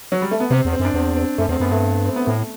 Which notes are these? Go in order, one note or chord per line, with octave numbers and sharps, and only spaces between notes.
F#3
G3
A3
B3
C3 C4
E2
C4
F#2
D4
E2 C4
C4
F#2 A3
E2 C4
F#2 B3
G2 A3
C4
B3
A2 A3